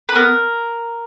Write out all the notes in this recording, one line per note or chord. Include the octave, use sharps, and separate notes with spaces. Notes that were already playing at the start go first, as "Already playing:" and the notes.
B4
B3 A#4